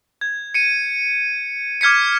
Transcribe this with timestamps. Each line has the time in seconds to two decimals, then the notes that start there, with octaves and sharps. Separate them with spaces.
0.21 G#6
0.54 C#7 D#7
1.81 D6 F6 G#6 B6 C#7